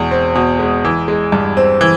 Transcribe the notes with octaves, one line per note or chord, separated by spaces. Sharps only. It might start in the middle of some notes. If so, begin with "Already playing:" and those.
Already playing: E2 B2 G#3
C4
B2
G#3
E3
G#3
G2
C4
E3